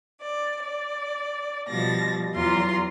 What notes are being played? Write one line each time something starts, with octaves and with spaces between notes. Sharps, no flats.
D5
D5
B2 F3 G3 A6 A#6
E2 F#3 F4 A#5 C6